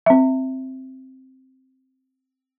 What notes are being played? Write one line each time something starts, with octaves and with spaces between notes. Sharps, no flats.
C4 E5